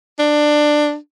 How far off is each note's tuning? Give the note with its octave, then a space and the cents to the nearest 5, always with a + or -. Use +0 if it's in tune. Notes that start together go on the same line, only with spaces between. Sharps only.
D4 +15